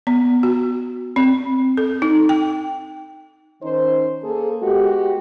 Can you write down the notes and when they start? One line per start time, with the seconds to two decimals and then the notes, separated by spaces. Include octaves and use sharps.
0.07 B3
0.43 F#4
1.16 C4
1.77 A4
2.02 D#4
2.29 G5
3.63 D#3 C#4 D#4 C5
4.23 A#3 G#4 A4
4.63 G#3 B3 F#4 G4